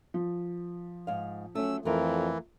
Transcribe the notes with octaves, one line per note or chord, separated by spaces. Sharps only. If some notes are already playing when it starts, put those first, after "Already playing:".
F3
G#2 F5
F#3 A3 C#4 E6
F2 E3 A3 F4 A#4